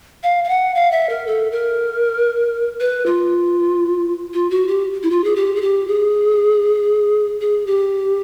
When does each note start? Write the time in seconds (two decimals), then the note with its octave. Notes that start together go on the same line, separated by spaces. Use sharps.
0.23 F5
0.44 F5
0.49 F#5
0.75 F5
0.92 E5
1.09 A#4
1.27 A4
1.52 A#4
2.80 B4
3.06 F4
4.34 F4
4.50 F#4
4.68 G4
5.03 E4
5.11 F4
5.24 G#4
5.36 G4
5.56 G#4
5.62 G4
5.88 G#4
7.41 G#4
7.67 G4